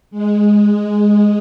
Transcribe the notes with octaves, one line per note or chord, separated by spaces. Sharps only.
G#3
G#3